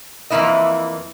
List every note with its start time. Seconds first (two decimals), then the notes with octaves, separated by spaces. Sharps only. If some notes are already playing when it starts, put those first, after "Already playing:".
0.30 F2 E3 A#3 C#4 E4 D#5